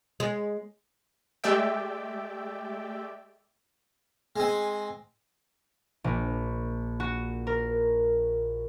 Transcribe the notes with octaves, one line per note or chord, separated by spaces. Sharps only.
G#3
G#3 A3 G4 D5 E5 G5
G#3 C4 G#5
A#1
F#4
A#4